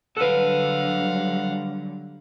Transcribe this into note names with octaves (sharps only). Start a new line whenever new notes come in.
D3 F#3 G3 A4 B4 F5 F#5